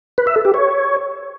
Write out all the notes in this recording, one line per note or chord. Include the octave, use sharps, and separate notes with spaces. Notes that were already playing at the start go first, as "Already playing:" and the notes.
B4
E5
A4
G4
C#5